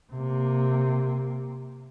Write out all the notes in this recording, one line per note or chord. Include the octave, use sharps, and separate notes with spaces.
C3 A#3